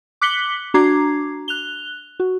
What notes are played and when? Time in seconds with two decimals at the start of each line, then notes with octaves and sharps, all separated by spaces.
0.21 D6 F#6 B6 C#7 F#7 G7
0.74 D4 F#4 A#5 D6 G#6 C7
1.48 F#6 F7 G7
2.20 F#4